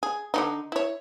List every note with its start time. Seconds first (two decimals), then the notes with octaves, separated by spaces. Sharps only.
0.03 G#4
0.34 D3 E3 D#4
0.72 E4 C#5